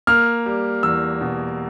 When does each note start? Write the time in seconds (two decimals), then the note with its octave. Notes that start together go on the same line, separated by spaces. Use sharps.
0.07 A#3 F6
0.46 G3
0.83 E2 E6
1.21 B2